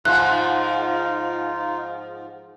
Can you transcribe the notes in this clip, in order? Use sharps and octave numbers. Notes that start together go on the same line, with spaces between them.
G#2 F3 D#4 F4 F#6